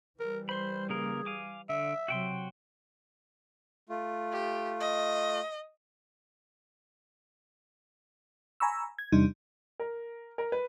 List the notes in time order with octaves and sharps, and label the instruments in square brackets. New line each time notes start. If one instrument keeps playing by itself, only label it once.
[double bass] E3 G3 [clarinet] A#4
[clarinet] C5 [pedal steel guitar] B5 C6
[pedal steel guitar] C#3 A#3 A#4 [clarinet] G#4
[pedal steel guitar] F5 G#5 D6
[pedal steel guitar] D3 [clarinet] E5
[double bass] C3 F#3 [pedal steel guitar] F#4 G5 C6
[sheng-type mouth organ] A3 F4
[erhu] G4
D#5
[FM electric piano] G#5 A#5 B5 C#6 E6
G#6
E2 C3 G3 D4 D#4
[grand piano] A#4
A#4
B4